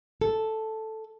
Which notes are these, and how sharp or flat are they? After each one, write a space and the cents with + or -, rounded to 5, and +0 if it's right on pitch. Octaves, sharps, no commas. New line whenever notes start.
A4 +0